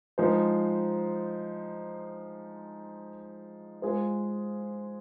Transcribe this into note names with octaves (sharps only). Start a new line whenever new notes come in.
F3 G#3 D#4 C5
G#3 F4 G#4 C5